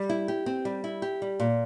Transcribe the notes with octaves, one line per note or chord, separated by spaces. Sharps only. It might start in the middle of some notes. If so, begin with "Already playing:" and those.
Already playing: G3
E4
G4
C4
G3
E4
G4
G3
A#2